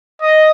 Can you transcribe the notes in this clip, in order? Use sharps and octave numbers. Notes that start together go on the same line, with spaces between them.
D#5